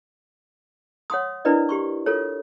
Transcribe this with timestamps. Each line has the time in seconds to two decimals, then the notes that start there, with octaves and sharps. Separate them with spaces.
1.10 C#5 F#5 C6 D#6
1.45 D4 E4 A#4 B4 D5 D#5
1.69 G4 C6 C#6
2.06 F4 A4 A#4 C#5